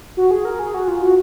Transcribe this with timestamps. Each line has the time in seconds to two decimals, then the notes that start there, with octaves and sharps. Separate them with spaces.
0.17 F#4
0.31 G#4
0.45 A#4
0.59 G#4
0.74 F#4
0.88 F4
1.02 F#4